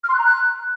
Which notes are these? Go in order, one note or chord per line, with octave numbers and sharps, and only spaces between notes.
F6
C6
F#6
A#5
F#6